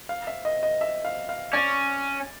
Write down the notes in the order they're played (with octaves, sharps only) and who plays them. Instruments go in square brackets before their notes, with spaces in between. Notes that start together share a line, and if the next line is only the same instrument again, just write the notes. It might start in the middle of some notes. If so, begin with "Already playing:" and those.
[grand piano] F5
E5
D#5
D#5
E5
F5
F5
[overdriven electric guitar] C#4 [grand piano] D5